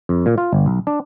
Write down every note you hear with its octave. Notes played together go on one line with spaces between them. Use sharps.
F2
A#2
F4
G1
B1
D4